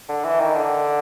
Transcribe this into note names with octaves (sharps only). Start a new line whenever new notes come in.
D3
E3
D#3
D3